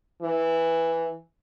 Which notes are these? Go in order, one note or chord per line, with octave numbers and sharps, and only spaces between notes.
E3